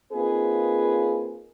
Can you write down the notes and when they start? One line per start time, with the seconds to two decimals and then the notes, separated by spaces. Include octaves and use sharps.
0.12 A#3 C4 D#4 F4 G#4 B4